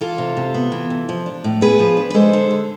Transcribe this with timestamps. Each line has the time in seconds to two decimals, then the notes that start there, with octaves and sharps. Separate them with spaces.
0.01 E3 F4 A4
0.18 C3
0.37 C3
0.54 B3
0.72 E3
0.90 C3
1.09 F3
1.26 D4
1.44 A2
1.61 B3 G#4 B4
1.79 F3
1.97 D4
2.10 B4
2.14 G#3 A4 C5
2.33 D3
2.51 D3